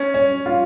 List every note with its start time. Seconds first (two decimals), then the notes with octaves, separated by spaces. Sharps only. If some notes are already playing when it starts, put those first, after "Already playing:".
Already playing: C#4
0.14 C#4
0.46 F4